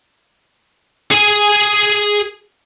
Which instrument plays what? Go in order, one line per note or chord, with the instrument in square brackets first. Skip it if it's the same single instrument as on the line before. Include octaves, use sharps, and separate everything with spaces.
[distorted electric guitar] G#4 G#5